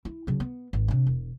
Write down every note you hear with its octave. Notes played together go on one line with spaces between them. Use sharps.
E4
C#3 F#3
B3
G#1
C3 D4
E1